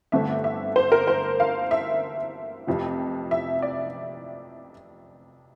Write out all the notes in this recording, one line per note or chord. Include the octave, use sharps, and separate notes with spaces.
G1 G2 D3 A3 C4 E5
E5
C5
A#4
C5
F5
E5
F1 F2 C3 F3
E5
D5